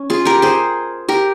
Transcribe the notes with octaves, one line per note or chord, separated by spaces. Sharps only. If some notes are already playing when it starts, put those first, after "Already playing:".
Already playing: C#4
F4 G#4
G4 A#4
G#4 C5
G4 A#4